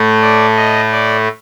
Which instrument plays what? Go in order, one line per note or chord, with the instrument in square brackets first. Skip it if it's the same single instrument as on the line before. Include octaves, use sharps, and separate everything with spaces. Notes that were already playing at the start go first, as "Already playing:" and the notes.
Already playing: [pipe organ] A2 A3
D5
D#5
D5